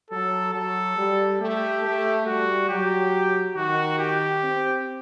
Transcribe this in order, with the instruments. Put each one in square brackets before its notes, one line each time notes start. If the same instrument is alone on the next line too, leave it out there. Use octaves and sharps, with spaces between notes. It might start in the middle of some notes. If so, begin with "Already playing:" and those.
[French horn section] F#3 [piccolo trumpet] A4
[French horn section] F#3 [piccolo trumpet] A4
[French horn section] G3
[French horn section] A3 [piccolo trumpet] G4
[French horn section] A3
[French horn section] G3 [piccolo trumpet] F#4
[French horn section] F#3 [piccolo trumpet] G4
[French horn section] D#3 [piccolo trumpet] F#4
[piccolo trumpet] G4
[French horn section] C4